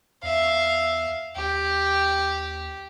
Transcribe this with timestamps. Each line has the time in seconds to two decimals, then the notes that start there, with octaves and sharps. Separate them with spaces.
0.23 E2 E5 F5
1.36 D#2 G4